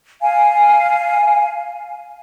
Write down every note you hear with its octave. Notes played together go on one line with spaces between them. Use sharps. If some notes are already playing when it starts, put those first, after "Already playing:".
F5 G#5